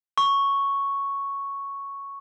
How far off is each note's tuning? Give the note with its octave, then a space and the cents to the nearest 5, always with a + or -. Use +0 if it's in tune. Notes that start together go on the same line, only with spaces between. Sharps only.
C#6 +0